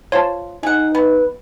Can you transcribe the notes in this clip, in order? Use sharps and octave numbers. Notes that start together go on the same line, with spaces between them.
F4 C5 C#5 A5
D#4 G#4 F#5
B3 B4